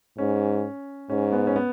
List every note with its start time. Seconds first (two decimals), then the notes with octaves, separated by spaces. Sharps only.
0.18 G#2 C#4
1.10 G#2 C#4
1.32 B3
1.47 C#4
1.56 B3